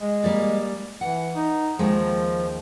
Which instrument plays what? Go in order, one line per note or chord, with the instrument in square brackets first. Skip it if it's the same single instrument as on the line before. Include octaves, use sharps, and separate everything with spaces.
[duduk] G#3
[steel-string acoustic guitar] G3 A#3 D5
[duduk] E3 [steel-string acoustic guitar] F#5
[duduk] D#4
[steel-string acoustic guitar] D#2 D#3 G#3 [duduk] F3